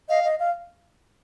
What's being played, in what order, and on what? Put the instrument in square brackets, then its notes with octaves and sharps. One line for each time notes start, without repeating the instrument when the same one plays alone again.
[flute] D#5 [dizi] F5
[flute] D#5
F5